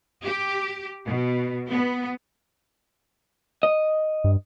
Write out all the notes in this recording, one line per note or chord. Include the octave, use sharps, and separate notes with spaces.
G4
B2
B3
D#5
G2